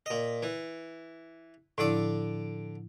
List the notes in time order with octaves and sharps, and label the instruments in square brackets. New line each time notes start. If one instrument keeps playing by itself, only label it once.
[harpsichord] A#2 D#5
E3
[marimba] A2 F3 E4 [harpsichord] D3 D5